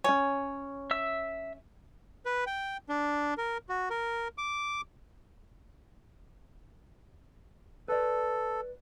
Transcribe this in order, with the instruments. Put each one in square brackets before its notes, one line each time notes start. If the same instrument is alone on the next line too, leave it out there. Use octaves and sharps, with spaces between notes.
[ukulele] C#4 G#5 [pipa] C#5
[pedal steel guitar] E5 E6
[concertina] B4
G5
D4
A#4
F#4
A#4
D6
[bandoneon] A4 [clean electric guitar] B4 D5